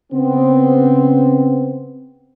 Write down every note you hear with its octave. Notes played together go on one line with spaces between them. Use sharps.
C#3 B3 C4